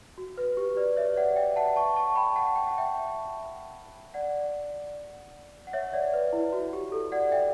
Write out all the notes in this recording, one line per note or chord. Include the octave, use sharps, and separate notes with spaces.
F#4
B4
G4
B4 D5
C#5 E5
D5 F#5
E5 G5
F#5 A5
A5 C#6
A5 C#6
G5 B5
F#5 A5
G5
F#5
E5 G5
D5 F#5
F#5
C#5 E5
D5 F#5
B4
E4
F#4
G4
A4
D5 F#5
E5 G5